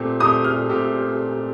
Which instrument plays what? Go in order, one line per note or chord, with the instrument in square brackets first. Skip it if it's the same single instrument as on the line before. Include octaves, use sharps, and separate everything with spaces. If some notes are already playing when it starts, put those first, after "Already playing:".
Already playing: [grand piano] A#2 A3 C4 G4
[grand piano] A#2 A3 C4 G4 [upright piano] D#6
[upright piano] F6
[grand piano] A#2 A3 C4 G4